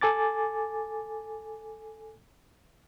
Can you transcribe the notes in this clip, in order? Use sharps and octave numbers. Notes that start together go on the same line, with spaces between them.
A4 G#5 D6 A6